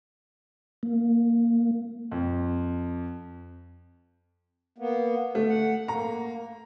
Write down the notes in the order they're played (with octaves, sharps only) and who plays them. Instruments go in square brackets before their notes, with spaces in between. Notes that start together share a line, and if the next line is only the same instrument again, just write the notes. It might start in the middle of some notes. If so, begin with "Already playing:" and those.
[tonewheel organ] A#3
[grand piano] F2
[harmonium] A#3 B3
[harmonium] D3 [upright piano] A3
[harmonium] F#5
[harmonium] A#3 [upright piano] A#5